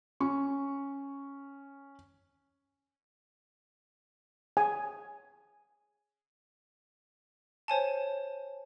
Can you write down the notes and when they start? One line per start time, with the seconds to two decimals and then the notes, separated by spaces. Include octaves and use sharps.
0.20 C#4 C#6
4.57 G#5
7.68 C5 C#5 G#5 A5